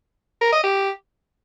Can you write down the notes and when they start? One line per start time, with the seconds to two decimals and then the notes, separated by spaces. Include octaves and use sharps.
0.41 A#4
0.52 D#5
0.64 G4